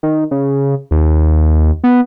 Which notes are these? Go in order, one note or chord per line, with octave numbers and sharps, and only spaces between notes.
D#3
C#3
D#2
B3